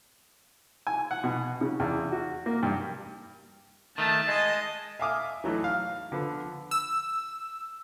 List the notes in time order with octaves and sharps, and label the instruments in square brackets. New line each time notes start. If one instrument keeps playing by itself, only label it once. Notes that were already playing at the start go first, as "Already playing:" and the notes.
[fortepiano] G#5
F#5
B2
C#3
E2
F#4
A#3
G2
[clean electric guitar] D#3 A3 [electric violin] A5
[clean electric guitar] G#3 [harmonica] D#5
[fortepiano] E5 F5 G#5 D6 D#6 F6
E3 F#3 A3 D#4
F5
D3 F3 B3
[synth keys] E6